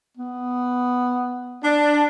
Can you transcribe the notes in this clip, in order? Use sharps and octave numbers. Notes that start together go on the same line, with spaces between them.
B3
D4